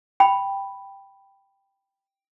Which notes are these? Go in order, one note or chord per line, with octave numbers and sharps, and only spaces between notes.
G5 B5